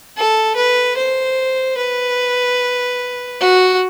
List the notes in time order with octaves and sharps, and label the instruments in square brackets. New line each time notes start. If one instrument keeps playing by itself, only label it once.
[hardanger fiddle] A4
B4
C5
B4
F#4